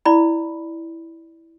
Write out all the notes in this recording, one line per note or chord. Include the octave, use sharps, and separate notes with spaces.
E4 D5 B5